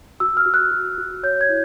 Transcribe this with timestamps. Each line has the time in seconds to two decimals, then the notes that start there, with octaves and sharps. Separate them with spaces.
0.20 F#4 E6
0.37 F6
0.46 F#4
0.54 F#6
0.71 F#4
0.98 F#4
1.23 C#5 G6
1.41 G#6
1.49 E4